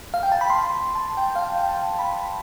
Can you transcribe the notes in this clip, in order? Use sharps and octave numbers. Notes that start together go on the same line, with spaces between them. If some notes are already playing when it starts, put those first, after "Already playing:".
F5
G5
A5
B5
C6
A5
G5
F5
G5
G5
A5
B5